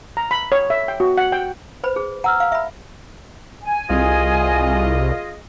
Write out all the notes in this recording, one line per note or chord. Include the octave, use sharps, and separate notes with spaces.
A#5
B5
C#5
E5
G5
F#4
F#5
G5
B4 C5 B5
G#4
F#5 A#5 E6 F6
F5
E5 B5
G#5
C2 F4 G#4 D#5